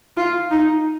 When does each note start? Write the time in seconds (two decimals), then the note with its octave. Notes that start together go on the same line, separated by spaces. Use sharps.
0.17 F4
0.51 D#4